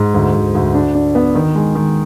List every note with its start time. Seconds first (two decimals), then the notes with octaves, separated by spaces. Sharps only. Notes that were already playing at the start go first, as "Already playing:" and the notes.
Already playing: G#2
0.14 D2
0.34 D2
0.55 D2
0.74 D4
0.95 D4
1.15 B3
1.35 D#3
1.55 G#3
1.75 D#3